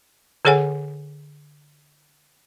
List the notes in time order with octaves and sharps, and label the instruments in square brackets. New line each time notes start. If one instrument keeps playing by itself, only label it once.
[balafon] D3 G#4 A4 C#5 F#5 G#5